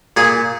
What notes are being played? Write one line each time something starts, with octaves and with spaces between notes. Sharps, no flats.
A#2 G#4